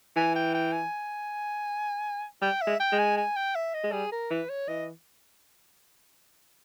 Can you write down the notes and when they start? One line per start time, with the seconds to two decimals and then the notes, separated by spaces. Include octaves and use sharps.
0.16 E3 G#5
0.35 G5
0.54 G5
0.72 G#5
2.42 G3 G5
2.61 E5
2.67 G#3
2.80 G5
2.92 G#3
2.98 G#5
3.17 G#5
3.36 G5
3.55 E5
3.74 D#5
3.84 G#3
3.92 G3 G#4
4.11 A#4
4.30 E3 B4
4.49 C#5
4.68 E3 D#5